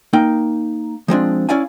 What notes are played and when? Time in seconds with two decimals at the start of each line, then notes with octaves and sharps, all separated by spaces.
0.13 A#3 D#4 G5
1.08 F3 G#3 C4 D4
1.49 C#4 E4 D5 F5 G#5